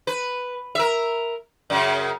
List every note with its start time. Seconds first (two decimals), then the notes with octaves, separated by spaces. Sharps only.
0.07 B4
0.75 A#4 E5
1.70 F#2 C#3